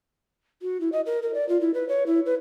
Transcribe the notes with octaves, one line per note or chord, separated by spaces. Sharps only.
F#4
E4
D#5
A#4
A#4
D5
F4
E4
B4
C#5
E4
B4